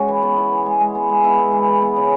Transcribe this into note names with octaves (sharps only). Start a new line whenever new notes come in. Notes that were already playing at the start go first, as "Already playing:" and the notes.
Already playing: G#3 C#4 F#4
E3 E4
B3
B3 E4
E3
G#3
G#3
B3
G#3
B3 E4
G#3
E3
E3
B3
C#3